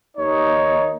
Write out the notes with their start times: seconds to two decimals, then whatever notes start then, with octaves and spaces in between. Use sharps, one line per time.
0.17 D#2 D#4 C#5